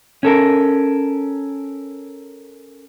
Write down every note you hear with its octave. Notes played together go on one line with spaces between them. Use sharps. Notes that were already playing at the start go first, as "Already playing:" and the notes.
C#4 A4 A#4